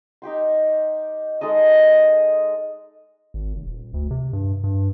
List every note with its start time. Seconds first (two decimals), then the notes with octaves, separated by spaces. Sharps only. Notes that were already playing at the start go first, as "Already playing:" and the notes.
0.22 D#4 G4 G5 C6
1.41 G#3 D#4 A4 D#5
3.34 G#1
3.55 F1
3.67 D#1
3.94 D2
4.11 C3
4.33 G2
4.64 G2